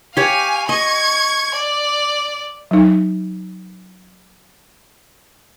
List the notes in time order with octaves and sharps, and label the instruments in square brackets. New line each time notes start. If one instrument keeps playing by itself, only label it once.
[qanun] G4 C#5 [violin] F5 G#5
[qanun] D#5 [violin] C#6 G#6
[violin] D5
[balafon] F#3 D#4